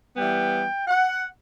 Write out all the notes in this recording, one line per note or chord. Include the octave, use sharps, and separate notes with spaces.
E3 G3 B3 G5
F#5